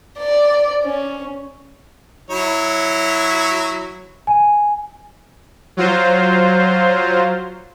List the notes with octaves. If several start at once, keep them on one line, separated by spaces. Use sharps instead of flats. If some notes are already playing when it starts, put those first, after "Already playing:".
D5
C#4
F#3 E4 C#5
G#5
F#3 F4 C5